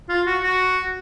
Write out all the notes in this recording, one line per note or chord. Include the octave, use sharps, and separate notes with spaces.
F4
F#4
F#4